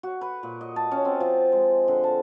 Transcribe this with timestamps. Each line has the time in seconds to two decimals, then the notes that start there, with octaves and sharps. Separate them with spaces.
0.03 F#4
0.21 B4
0.43 A#2
0.61 D#5
0.76 A5
0.91 C#4
1.05 C4
1.20 F3
1.52 G#3
1.88 D3
2.04 A5